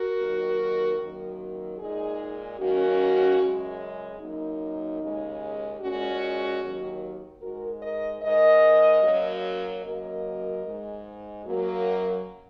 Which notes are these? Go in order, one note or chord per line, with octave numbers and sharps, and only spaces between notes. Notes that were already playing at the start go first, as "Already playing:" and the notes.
Already playing: F#4 A#4
D#2 D#3 F#3 A#3
F#2 D#3 F#3 A#3
A#2 G#3 D#4 G#4
F#2 D#3 A#3 C#4 F#4
F#2 C#3 G#3
F#2 F#3 A#3 D#4
D#2 C#3 G#3
A#2 G#3 C#4 F#4
D#2 D#3 F#3 A#3
G#2 G#3 F#4 A#4
A#4 D#5
G#2 G#3 A#4 D#5
F#2 F#3 A#3
F#2 C#3 F#3 A#3 A#4 D#5
G#2 G#3
F#2 F#3 A#3